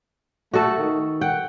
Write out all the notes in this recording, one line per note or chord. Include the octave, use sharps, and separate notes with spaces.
A3 F#4 A4
D#3
F#5 G5